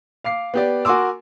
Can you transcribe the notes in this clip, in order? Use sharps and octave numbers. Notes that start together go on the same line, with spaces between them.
F5 D6 C7
B3 G4 D5
F#4 A#4 G#5 C6 D6 E6